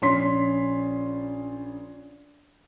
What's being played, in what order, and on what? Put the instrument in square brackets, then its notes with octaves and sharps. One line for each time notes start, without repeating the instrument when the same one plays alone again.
[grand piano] A#1 C#4 C6 B6